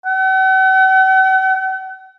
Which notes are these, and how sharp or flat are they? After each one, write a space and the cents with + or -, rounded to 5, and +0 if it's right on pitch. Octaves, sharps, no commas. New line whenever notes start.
F#5 +45